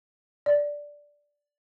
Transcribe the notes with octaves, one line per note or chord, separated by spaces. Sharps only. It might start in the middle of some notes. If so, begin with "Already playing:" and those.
D5